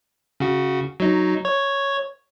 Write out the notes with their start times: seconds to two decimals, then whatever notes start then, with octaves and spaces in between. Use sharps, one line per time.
0.40 C#3 F#4
1.00 F#3 D#4
1.45 C#5